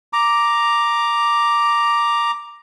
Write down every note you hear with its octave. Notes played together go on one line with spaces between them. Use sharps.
A#5 D6